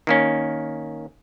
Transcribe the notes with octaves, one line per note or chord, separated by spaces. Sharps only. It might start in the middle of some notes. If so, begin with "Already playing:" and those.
D#3 A#3 C#4